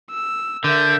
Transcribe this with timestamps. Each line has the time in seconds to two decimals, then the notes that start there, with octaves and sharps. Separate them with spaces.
0.11 E6
0.64 D3 A#4 E5 G6